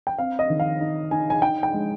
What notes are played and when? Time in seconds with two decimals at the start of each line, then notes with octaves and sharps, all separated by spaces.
0.07 G5
0.18 C4 F5
0.39 D#5
0.50 D#3
0.60 F5
0.81 D#4
1.11 D#4 G#5
1.30 G#5
1.42 D#4 G5
1.63 G5
1.73 G#3